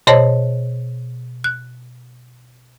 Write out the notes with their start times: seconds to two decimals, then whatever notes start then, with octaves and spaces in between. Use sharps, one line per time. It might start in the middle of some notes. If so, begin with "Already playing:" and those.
0.07 B2 C5 C#5 D#5 A5
1.44 F#6